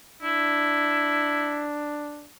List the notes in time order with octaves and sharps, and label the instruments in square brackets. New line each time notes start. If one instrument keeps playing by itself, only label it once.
[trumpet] D4 [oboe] E4